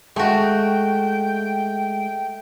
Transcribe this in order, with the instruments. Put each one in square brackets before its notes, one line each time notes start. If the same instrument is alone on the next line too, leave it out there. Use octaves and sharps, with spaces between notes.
[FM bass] G#3 [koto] A3 F#4 [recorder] G5